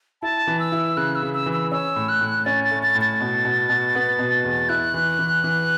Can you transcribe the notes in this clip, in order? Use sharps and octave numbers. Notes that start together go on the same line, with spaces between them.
E4 A5
E3
E6
E4
C#3 F#6
E6
C#3
E6
E3
E6
C#4 E6
A2
F#6
A2
C#4 A6
A6
A3
A6
A2
A6
B2
B2
B2
B3
B2
E2
E4 F#6
E3
E3
E3